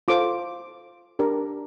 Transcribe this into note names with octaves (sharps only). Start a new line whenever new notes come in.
F4 A4 C5 D6
D4 G4 A#4